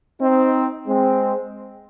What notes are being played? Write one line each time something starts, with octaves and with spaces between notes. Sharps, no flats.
C4 D#4
G#3 C4